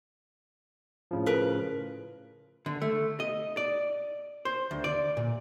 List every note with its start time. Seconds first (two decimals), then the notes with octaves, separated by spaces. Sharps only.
1.11 A2 C#3 F3
1.26 A#4 B4
2.66 D3
2.82 A3
3.20 D#5
3.57 D5
4.45 C5
4.71 D2
4.84 D5
5.17 A#2